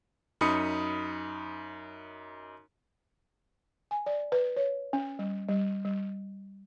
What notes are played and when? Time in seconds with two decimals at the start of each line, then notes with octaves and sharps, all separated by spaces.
0.41 F#2 D#4 B5 D#6 C#7
3.91 G#5
4.06 D5
4.32 B4
4.57 C#5
4.93 C#4
5.19 G3
5.49 G3
5.85 G3